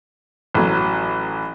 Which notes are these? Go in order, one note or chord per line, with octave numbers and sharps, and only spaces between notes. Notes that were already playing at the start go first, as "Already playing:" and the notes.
A1 F#3